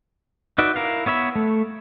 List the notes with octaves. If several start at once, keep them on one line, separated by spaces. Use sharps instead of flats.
D#4 F#4 B4 D5 E5
E4 A#4 F5
B3 C#5 E5 B5
A3